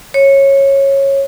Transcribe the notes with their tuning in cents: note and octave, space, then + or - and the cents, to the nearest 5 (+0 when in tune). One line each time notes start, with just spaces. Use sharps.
C#5 -15